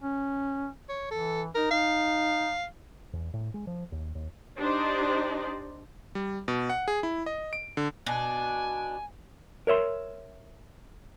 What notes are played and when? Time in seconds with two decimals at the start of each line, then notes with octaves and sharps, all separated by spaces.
0.02 C#4
0.89 C#5
1.11 E3 A4
1.55 D#4 A#4
1.71 D#4 F5
3.13 E2
3.34 A2
3.54 G#3
3.67 F3
3.92 D#2
4.15 D#2
4.59 D4 D#4 G4 C5 D5 D#5
6.15 G3
6.48 B2
6.70 F#5
6.88 G#4
7.03 E4
7.26 D#5
7.53 D7
7.77 D3
8.06 B2 D4 G#5
9.67 A#4 C#5 E5 C6